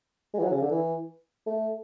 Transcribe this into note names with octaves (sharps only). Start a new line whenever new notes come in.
G#3
E3
F#3
C#3
D3
E3
A3